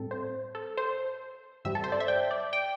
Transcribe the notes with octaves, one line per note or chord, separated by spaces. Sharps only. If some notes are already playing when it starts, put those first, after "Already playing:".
Already playing: A2 G3 C4 A4
C5
A4
C5
G2 G3 C4 E5
A4
C5
D5
E5
G5
D5
G5